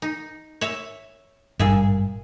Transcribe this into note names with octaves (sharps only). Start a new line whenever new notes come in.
D#4
C#5 E5
G#1 G2 A#2 G#4 E5